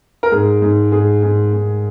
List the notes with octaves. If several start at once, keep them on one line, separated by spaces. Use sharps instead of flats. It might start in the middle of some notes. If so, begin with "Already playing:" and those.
A#4
G#2 G#4
G#2
G#2 G#4
G#2
G#2